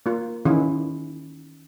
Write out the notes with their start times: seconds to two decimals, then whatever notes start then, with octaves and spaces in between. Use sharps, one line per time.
0.06 A#3 F4
0.45 D#3 E3 C#4 E4 G#4